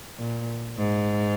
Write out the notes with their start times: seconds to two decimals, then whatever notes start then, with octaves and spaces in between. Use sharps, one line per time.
0.18 A#2
0.78 G#2